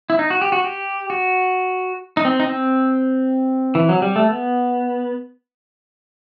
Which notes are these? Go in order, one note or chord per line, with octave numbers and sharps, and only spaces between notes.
E4
D#4
F#4
G4
F#4
G4
F#4
D#4
C4
D#4
C4
E3
F#3
G3
A3
B3